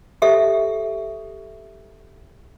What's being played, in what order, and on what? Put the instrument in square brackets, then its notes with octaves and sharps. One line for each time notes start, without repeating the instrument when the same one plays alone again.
[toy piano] G4 A4 E5